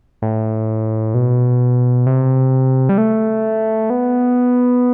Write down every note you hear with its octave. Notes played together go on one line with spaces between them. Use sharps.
A2
B2
C3
G3
A3
B3